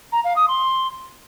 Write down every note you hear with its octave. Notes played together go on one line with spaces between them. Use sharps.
A#5
F5
D#6
C6